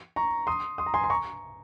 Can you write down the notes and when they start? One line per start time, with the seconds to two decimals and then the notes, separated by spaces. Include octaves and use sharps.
0.16 A#5 C#6
0.47 C6 D#6
0.78 C6 D#6
0.86 A#5
0.94 G#5 C6
1.04 C6
1.10 A#5 C#6